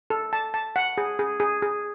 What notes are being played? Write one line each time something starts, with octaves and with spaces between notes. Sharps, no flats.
A4
A5
A5
F#5
G#4
G#4
G#4
G#4